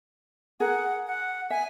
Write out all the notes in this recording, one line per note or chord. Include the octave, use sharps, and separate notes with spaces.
G#4 A#4 F#5
F#5
E5 G#5